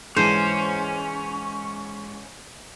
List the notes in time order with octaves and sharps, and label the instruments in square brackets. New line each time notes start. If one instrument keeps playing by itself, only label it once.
[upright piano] G#2 E3 [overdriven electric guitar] C#4 [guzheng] C5